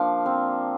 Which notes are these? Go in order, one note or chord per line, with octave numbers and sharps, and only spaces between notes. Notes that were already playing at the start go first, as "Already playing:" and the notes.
Already playing: F3 A#3 D4 F5
C4